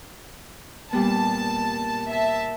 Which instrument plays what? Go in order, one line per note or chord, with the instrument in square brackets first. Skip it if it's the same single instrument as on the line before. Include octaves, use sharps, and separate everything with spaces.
[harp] A#2 G3 B3 [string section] A5
[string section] E5 A5